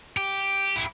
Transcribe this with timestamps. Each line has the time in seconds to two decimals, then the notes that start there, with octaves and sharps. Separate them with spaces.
0.17 G4
0.76 E4